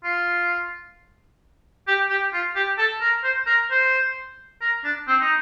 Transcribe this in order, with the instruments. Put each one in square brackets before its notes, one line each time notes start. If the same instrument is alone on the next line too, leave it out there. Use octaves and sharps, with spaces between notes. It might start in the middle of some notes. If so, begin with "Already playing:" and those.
[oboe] F4
G4
G4
F4
G4
A4
A#4
C5
A#4
C5
A#4
D4
C4
D#4